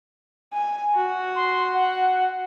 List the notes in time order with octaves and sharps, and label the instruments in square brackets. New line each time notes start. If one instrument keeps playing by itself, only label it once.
[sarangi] G#5
F#4
[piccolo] C6
F#5